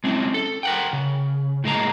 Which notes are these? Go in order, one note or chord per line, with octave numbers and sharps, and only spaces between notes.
G#3 C4 C#4 E4
A4
A#4 F#5 G5
C#3
A2 G#3 A#3 A#5